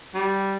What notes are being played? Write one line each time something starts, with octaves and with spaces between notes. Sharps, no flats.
G3